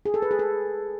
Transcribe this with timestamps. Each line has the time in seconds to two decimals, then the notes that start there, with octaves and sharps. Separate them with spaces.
0.05 G#4
0.14 A4
0.22 B4
0.31 G#4
0.39 A4